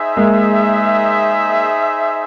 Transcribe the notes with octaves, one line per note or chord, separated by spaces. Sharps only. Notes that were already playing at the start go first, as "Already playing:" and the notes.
Already playing: D#4 G#4 C5 E5
G#3 A#3